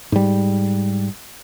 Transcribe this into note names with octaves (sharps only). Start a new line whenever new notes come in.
G#2 G3